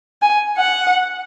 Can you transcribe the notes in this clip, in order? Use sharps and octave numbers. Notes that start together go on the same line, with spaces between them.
G#5
F#5